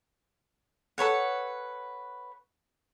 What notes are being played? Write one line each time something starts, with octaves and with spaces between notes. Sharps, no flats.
A4 B4 C#5 F#5